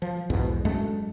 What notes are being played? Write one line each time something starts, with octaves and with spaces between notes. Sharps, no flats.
F3
B1 E2 G#2 B2
F#2 G#3 A3